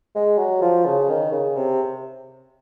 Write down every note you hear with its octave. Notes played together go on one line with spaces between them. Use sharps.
G#3
F#3
F3
C#3
D#3
C#3
C3